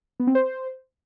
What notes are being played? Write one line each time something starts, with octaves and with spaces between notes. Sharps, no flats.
B3
C4
C5